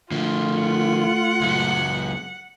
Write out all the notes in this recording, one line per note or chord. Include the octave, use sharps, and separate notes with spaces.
D3 F3 A3 F4
F#5
C#2 F#3